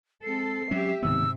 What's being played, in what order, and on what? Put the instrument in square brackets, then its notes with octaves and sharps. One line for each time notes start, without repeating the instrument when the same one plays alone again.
[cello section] G#3 C4 A4 [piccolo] C7
[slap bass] F#3 C#4 [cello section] G4 E5
[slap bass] D1 D#3 B3 [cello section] G#2 C3 [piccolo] E6